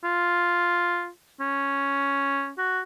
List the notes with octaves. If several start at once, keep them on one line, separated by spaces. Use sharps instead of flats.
F4
C#4
F#4